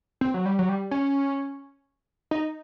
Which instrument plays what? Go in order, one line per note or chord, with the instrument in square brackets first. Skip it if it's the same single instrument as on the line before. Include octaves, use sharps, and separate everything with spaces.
[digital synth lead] C4
F#3
G3
F#3
G3
C#4
D#4